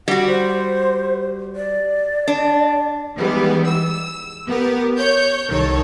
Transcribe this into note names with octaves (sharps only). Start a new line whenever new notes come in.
G3 F#4 F#5
C5
D5
D4
D#3 E3 G3 G#3 B3
E6
B3 G4 A#4 B4
C#5 G6
C2 D#3 A4 C#5